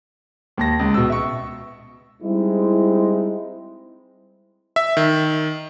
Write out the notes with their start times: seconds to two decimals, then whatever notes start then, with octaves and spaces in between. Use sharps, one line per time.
0.57 D#2 A5 A#6
0.79 C#2
0.94 B2 E6
1.10 E5 C#6
2.23 G3 G#3 C4 D#4 E4
4.76 E5
4.97 D#3